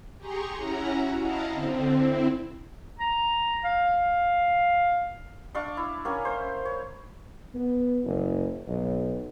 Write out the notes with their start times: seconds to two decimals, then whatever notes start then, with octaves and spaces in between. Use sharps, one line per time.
0.17 G4 G#4 A#5 C6 C#6
0.56 C#4 E4 F#5 A#5
0.89 F#4
1.20 E4 D#5 F5 A5 A#5
1.51 D3 C4
1.96 C4 E4
2.99 A#5
3.64 F5
5.55 D4 D5 F5 C#6
5.77 E4
6.05 A#3 C#4 G#5
6.25 C5
6.65 C#5
7.55 B3
8.04 F#1
8.67 B1